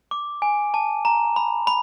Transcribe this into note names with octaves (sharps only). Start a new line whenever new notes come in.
D6
G#5
A5
A#5
B5
B5